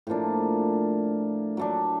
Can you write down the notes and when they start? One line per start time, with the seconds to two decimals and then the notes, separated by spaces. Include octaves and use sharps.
0.07 A2 F3 A#3 D4
1.57 F#3 A3 D4